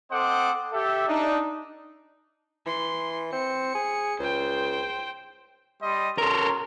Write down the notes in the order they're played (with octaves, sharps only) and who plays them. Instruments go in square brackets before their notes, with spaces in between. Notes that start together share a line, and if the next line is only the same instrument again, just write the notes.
[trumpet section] C4 A4 C5 D#5 F#5 D6
G4 A4 E5
D4 D#4
[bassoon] E3 [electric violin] C6
[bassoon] C4 [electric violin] C#7
[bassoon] G#4
[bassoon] C#2 [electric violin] C5 G5
[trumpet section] G3 D#5 C6
[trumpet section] C#4 F#4 C6 [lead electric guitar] A4 A#4